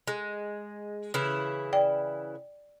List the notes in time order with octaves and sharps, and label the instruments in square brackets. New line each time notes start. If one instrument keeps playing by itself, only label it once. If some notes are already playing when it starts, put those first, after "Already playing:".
[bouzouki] G#3
C#3 E3 E4
[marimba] D5 G5